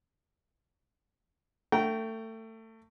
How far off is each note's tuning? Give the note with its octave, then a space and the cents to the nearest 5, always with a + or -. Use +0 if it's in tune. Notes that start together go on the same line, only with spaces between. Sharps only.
A3 +25 G5 -20 A#5 +0